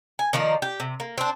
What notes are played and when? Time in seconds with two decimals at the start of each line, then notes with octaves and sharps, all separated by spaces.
0.19 G#5
0.33 D#3 F3 A#3 D5
0.62 G4
0.80 C3
1.00 A#3
1.18 C4 D4